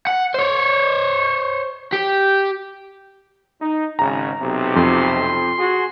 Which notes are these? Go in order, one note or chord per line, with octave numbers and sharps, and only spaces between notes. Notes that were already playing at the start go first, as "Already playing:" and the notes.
F#5
C5 C#5
G4
D#4
G#1 C#3 A#5
B1 C3
F2 C6
F#4 G#4